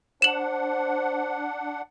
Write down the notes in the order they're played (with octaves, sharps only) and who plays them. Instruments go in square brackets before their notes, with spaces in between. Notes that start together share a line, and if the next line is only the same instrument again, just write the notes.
[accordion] D4 F#5 [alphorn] C5 [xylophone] E7 F#7